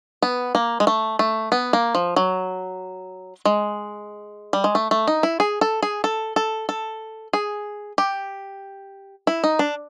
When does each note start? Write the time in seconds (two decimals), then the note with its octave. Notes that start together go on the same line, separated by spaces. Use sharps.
0.22 B3
0.55 A#3
0.80 G#3
0.87 A3
1.19 A3
1.52 B3
1.73 A#3
1.95 F3
2.16 F#3
3.45 G#3
4.53 G3
4.64 G#3
4.75 A3
4.91 A3
5.07 D#4
5.23 E4
5.40 G#4
5.61 A4
5.83 G#4
6.04 A4
6.36 A4
6.69 A4
7.33 G#4
7.98 G4
9.27 E4
9.44 D#4
9.59 D4